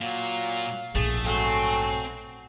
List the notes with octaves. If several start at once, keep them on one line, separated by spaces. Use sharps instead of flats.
A#2 F#3 F5
A#1 G#2 A3 G#4
F#3 A3 C4 G#5